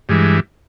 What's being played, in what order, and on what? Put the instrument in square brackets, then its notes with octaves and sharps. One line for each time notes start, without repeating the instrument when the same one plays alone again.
[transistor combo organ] G2 E3 G#3